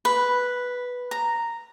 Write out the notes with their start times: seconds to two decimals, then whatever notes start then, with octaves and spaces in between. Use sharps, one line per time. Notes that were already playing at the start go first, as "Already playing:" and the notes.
0.05 B4
1.11 A#5